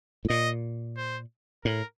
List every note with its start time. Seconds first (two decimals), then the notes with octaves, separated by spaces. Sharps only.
0.25 A2
0.29 A#2 D#5
0.97 C5
1.65 A2 A#4